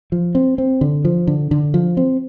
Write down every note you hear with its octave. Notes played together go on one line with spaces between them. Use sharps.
F3
C4
C4
D3
F3
D3
D3
F3
C4